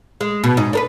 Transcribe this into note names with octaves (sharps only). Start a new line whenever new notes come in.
G#3
B2
G#2 D#4
D4 A#4 B4